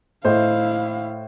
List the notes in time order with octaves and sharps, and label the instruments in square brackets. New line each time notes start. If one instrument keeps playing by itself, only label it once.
[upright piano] A2 C5 D#5 [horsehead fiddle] E4 F5